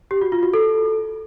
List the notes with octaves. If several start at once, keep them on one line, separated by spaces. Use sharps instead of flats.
G4
F#4
F4
F#4
A4